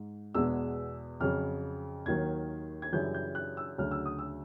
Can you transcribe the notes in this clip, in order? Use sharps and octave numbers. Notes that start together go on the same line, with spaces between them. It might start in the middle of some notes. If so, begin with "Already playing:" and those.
Already playing: G#2
E2 B2 G#3 E6
F2 C#3 F#3 F6
D#2 D#3 F#3 G#6
G#6
F#2 C#3 E3 G3 G6
G6
F#6
E6
D2 C#3 F#3 F6
E6
D#6
E6